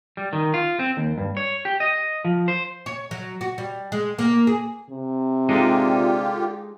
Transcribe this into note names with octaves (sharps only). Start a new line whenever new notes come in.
G3
D#3
F4
C4
D#2
G2
C#5
G4
D#5
F3
C5
C#5
F#3
F#4
G3
G#3
A#3
G#4
C3
D3 G#3 D4 D#4 F4 G4